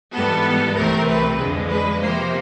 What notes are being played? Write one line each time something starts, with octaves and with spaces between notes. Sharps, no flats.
G#2 E3 G3 B3 A4
C2 C3 E3 A3 C4 A#4
B4
F2 D3 F3 G#3
B4
C3 F3 A#3 C5